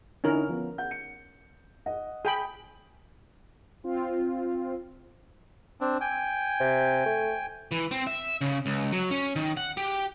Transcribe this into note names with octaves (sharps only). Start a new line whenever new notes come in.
D3 C#4 D#4 E4 A#4
F3 B3
F#5 G6
C#7
D#5 F#5
G#4 G5 B5
C4 F4
C4 D4
G5 G#5
C3
A3
E3
C4
E5
C#3
C#2
F#3
C#4
D#3
F#5
G4